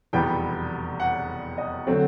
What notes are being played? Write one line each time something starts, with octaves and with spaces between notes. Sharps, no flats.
F1 E2 B2 G3 B3 G5
F#5
D#5
D3 F#3 A3 C4